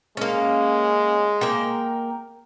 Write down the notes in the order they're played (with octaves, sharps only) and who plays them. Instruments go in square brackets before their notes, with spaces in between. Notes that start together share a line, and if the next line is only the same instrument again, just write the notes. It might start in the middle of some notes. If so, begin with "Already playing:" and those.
[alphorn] G#3 [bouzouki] A#3 C#4
[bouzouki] A#3 A#4 G5